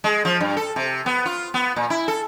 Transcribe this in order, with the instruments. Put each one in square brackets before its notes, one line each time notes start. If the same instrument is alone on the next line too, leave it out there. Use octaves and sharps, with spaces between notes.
[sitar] G#3
F3
G2
A4
C3
B3
F4
B3
A#2
E4
A4